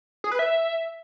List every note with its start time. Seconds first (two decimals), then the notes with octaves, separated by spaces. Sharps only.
0.24 G#4
0.32 B4
0.39 E5